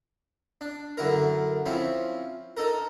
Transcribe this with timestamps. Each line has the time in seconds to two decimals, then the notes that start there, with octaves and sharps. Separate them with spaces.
0.61 D4
0.97 F#2 D3 E4 A#4
1.66 F3 C4 C#4 E4
2.57 D#4 A4 A#4